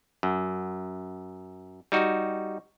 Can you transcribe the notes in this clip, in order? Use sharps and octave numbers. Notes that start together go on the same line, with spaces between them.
F#2
G3 D#4 F#4